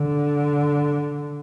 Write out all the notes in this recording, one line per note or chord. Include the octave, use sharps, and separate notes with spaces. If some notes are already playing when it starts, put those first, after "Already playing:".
Already playing: D3